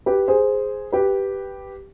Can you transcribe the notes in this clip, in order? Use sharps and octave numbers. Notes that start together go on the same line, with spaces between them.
G4 B4
G#4 C5
G4 B4